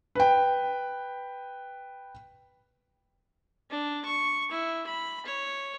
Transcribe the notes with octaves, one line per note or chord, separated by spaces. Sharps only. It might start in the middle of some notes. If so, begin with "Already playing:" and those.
B4 G5
D4
C#6
E4
B5
C#5